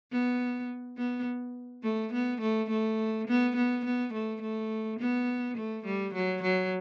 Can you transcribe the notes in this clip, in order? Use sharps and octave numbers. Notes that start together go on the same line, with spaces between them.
B3
B3
A3
B3
A3
A3
B3
B3
B3
A3
A3
B3
A3
G3
F#3
F#3